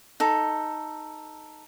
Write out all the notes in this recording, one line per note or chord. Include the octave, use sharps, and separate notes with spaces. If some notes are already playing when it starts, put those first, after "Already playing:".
D#4 A4